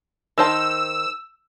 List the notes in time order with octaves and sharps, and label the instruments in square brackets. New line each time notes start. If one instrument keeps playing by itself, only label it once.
[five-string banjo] D#3 C5 A5 [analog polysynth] E6